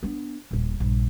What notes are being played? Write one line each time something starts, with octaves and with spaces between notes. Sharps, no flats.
B3 D4
D#1 A#1
A#1 G2